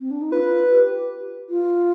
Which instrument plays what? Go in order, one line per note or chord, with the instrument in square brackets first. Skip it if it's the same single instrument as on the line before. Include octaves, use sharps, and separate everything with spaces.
[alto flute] C4
D4
D#4
[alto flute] F4 [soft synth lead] B4
[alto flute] G4
F4